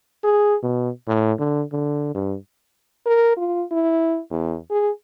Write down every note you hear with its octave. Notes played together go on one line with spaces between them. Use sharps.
G#4
B2
A2
D3
D3
G2
A#4
F4
E4
E2
G#4